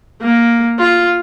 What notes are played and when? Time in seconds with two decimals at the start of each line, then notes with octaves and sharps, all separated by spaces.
0.22 A#3
0.79 F4